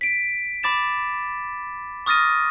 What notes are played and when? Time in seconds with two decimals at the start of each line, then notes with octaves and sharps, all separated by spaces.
0.01 B6 D7
0.63 B5 D6 A6 E7
2.06 C#6 D#6 F6 A6 A#6 D#7